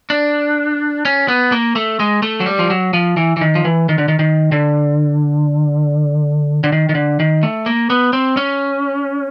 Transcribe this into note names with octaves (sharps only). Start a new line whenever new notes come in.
D4
C#4
B3
A#3
A3
G#3
A3
F#3
G3
F3
F#3
F3
E3
E3
D#3
F3
E3
D#3
D3
D#3
D#3
D3
D3
D#3
D#3
D3
D#3
A3
A#3
B3
C4
C#4